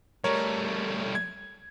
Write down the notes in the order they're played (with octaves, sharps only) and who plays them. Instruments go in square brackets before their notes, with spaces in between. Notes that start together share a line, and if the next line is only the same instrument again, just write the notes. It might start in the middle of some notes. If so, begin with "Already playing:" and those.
[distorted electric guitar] G3 A3 [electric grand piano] A#4 C#5
[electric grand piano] G#6